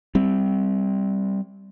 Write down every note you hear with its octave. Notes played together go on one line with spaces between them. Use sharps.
G3 C4